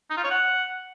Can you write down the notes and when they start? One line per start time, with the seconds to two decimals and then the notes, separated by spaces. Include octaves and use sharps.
0.10 D#4
0.17 F4
0.24 C#5
0.31 F#5